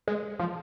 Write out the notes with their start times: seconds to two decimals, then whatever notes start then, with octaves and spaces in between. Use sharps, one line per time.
0.08 G#3
0.39 F3